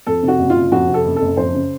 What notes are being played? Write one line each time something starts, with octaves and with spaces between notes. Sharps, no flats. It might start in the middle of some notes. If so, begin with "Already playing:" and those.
F2 A4
C3
F#4
F#1
F4
F#1
F2 F#4
C3
A4
F#1
F#1 A4
F2 C5
C#3